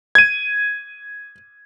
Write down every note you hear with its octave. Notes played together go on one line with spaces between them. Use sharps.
G#6 D#7